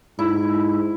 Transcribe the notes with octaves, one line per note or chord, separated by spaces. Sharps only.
G#2 E4